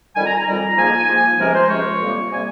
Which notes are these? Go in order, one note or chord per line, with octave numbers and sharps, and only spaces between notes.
F2 D#3 G3 G#5
A#5
A#5
F2 D#3 G3
G#2 F3 A#3 G#5
G#2 F3 A#3
C#2 C3 F3 G#3 A#4
C5
C#2 C3 F3 G#3 C#5
F2 C3 G3 A#3
C3 G3 A#3 G#5